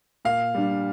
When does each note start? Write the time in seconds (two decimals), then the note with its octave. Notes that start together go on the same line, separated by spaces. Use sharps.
0.25 A#2 F5
0.55 G3 D4